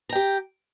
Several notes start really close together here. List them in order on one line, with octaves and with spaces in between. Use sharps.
A#5 G5 G4